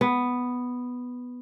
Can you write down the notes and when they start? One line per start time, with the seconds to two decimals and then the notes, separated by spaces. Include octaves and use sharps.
0.01 B3